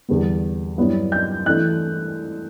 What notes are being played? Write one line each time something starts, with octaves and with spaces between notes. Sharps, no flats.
E2 D3 G3 B3
G2 F#3 B3 E4
G6
E3 A3 D4 F#6